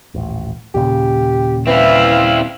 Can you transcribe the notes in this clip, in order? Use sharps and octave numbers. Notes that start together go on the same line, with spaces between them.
D#1 A1
D#2 A#2 C#3 G4
E3 C4 E4 E5 F5